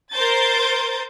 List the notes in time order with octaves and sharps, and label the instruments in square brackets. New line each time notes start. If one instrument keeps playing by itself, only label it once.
[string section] A#4 C5 G6 A6